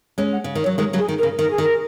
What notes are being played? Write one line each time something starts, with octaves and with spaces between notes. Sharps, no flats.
G#3 C#4 C#5
F#5
C#3
D#3
C#5
F#3
D#3 G#3 A#4
C#3 F#3
G#4
D#3
A#4
C#3
D#3 A#4
G#4
D#3
A#4